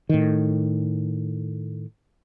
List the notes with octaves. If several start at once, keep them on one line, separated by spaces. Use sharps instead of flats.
A2 D#3